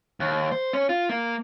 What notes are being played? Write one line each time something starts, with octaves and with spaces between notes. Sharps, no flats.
D#2
C5
C#4
F4
A#3